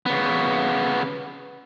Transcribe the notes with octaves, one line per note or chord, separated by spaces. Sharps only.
C#3 B3